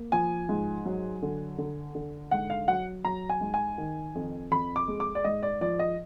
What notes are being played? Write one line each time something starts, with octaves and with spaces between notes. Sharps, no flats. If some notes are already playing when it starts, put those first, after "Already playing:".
Already playing: A#3
F3 G#5
G#2
F#3
D3
D3
D3
G#2 F#5
F5
F#3 F#5
F#3 A#5
G#5
G#2
G#5
D#3
F2
F2 B5
D6
G#3
D6
D5
G#2 D#5
D5
F3 D5
D#5